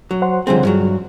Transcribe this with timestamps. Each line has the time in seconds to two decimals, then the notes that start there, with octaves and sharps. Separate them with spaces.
0.11 F#3
0.22 C5 F#5 C6
0.47 C#2 D3 F3 G3 C4 G#4
0.65 G2 F#3